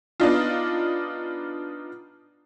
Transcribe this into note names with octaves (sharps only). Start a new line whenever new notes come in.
B3 D4 D#4 F4